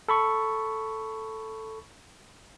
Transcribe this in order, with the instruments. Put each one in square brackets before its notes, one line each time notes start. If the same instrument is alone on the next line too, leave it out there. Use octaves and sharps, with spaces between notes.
[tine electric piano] A4 B5 C#6